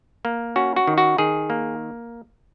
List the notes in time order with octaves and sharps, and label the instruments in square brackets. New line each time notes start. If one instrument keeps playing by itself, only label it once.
[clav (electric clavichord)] A#3
C#4 F#4
F#4
D#3
F#4
D#3 G#4
A#3